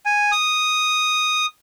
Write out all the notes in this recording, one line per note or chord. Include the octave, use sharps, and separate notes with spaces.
G#5
D#6